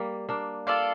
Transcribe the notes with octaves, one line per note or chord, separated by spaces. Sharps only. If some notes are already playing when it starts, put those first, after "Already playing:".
Already playing: G3 A#3
A#3 D4
F4 A4 D5 F5